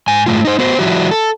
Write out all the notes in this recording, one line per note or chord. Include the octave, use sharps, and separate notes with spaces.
G#2 G#5
G#2 C#3 A3 F4
D#4 C5
B3 F#4 C5
F3 G3 E4 F#4
A4